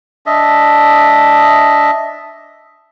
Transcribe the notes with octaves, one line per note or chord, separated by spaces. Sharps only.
D4 D#5 E5